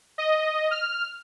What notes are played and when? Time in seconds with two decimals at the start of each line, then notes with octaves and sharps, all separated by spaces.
0.18 D#5
0.71 F6